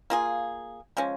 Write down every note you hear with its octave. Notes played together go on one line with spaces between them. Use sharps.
A#3 F4 G#4
F3 G#3 C#4